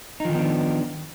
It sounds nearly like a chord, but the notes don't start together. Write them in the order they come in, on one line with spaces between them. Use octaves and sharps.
D#4 F3 D#3 B3 D4